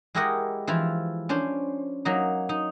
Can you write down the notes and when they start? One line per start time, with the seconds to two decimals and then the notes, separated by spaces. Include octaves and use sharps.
0.15 G#3 E4 G4 A#4 D#5 F#5
0.67 E3 F3 E4 F4
1.29 C#4 D4 C5
2.05 F#3 A#3 D#4
2.49 D#4